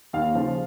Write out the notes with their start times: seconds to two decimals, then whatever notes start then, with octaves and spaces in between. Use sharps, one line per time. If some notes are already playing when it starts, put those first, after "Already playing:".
0.13 D#2 F5
0.35 C#3 F3